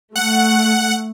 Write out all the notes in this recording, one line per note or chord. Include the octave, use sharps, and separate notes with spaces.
A3 F#5